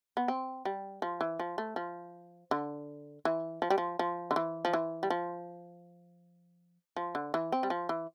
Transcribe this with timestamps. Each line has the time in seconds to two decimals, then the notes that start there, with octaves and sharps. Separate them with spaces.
0.17 B3
0.28 C4
0.65 G3
1.02 F3
1.21 E3
1.39 F3
1.58 A3
1.76 F3
2.51 D3
3.25 E3
3.62 F3
3.70 G3
3.78 F3
3.99 F3
4.31 D3
4.36 E3
4.65 F3
4.73 E3
5.03 G3
5.10 F3
6.96 F3
7.15 D3
7.34 E3
7.52 C4
7.63 G3
7.70 F3
7.89 E3